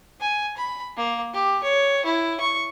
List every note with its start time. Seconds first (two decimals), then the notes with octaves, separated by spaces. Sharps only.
0.21 G#5
0.57 B5
0.97 A#3
1.34 G4
1.63 C#5
2.06 E4
2.41 C#6